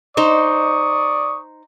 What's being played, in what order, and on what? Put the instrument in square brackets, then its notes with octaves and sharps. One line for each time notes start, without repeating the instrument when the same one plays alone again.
[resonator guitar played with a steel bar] D#4 C5 [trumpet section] D5 C#6 D#6